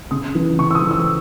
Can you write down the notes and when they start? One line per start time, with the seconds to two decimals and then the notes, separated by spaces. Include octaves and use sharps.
0.11 C#3 D#6
0.35 E3
0.58 C#3 C#6
0.71 E6
0.75 D#6
0.82 E3
0.91 E6